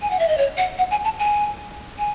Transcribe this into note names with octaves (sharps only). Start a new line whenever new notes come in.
G#5
F#5
E5
D#5
C#5
F#5
F#5
G#5
A5
G#5
G#5